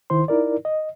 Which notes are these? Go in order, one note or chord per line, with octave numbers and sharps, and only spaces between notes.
C2 D#3 E4 C5 C6
D#4 E4 A#4 D5
D#5